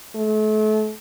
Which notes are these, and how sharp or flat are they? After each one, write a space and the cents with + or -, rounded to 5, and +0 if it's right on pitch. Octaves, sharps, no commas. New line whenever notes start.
A3 -35